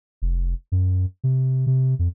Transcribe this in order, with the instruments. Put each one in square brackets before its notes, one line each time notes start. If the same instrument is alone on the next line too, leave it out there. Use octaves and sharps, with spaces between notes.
[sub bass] F1
F#2
C3
C3
F2